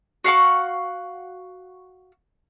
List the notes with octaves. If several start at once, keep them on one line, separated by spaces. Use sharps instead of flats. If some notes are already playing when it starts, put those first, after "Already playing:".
F#4 F5 F#5 C#6